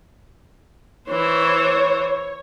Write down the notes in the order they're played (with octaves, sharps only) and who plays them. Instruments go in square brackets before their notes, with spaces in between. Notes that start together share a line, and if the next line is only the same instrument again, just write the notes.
[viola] E3 C5 [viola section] C#5